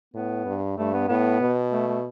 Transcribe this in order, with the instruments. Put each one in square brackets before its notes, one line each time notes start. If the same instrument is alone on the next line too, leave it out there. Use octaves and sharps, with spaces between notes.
[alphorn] A2 [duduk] B3
[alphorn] G2
[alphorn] G2 [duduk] A3
[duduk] B3
[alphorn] A2 [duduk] B3
[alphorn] B2
[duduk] A3
A3